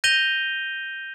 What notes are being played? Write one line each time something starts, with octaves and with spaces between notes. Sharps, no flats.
G6 A#6 D#7 F7 G7